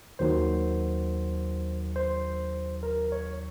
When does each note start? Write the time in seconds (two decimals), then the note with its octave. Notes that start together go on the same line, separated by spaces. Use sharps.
0.19 D#2 D#3 F#3 C5
1.96 C5
2.83 A#4
3.12 C#5